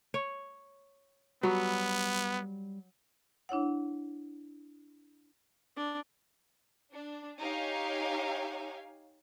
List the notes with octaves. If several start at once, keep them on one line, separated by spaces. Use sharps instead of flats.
C#5
F#3 G3 B3
D4 E4 C#5 F#5
D4
D4
D#4 G4 C#5 F5 G#5